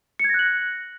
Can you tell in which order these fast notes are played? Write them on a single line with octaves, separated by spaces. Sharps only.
C#7 G#6 A#6 F#6 F#7